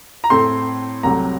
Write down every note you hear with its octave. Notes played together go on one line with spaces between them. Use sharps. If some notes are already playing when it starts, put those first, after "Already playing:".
A#5
A2 A3 C4 C6
C2 C3 F#3 A3 A#5